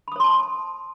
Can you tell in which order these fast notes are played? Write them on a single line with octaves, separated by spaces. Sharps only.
B5 D#6 C#5 C6 A5